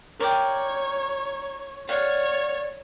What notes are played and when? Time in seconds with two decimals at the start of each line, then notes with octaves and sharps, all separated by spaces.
0.20 A#4 C#5 D5 G5
1.89 C#5 D5 F5 F#5